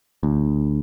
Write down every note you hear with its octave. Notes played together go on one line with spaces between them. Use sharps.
D2